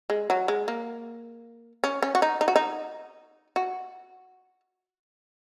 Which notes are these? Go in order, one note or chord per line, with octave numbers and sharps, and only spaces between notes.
G#3
F#3
G#3
A#3
C#4
C#4
F#4
D#4
D#4
F#4
D#4
F#4